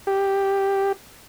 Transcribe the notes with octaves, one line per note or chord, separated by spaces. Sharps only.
G4